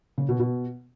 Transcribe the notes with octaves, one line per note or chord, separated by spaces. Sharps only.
C#3
B2
B2